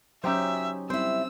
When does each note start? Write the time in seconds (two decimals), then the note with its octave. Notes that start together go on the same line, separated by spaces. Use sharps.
0.24 F#3 C#4 D#4 G4 C5 E5
0.90 G3 C4 E4 C5 E6